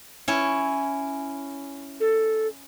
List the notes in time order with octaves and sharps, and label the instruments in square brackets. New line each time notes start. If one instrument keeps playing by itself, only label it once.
[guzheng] C#4 E4
[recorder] A4